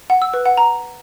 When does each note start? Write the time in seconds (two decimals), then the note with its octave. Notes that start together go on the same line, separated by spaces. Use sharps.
0.10 F#5
0.22 E6
0.34 B4
0.46 F#5
0.57 A#5